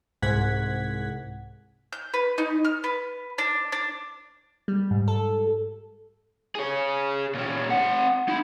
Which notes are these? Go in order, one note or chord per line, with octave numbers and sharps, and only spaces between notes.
C2 G#2 F#5 G#6 B6
G6
B4
D#4
F6
B4
D4
D4
G3
G#2
A4
G#4 C#5
A#2 C#4
C4 F#5
D#4 B5